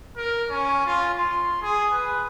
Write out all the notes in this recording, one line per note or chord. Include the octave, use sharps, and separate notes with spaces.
A#4
C#4
F4
C6
G#4
B4